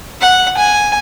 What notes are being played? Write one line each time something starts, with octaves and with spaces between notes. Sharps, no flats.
F#5
G#5